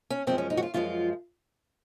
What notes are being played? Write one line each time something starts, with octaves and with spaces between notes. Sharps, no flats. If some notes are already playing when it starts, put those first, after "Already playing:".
C#4
F#2 F3 G#3 C4
C#4
D#4
F#4
F4
F#2 F3 G#3 F4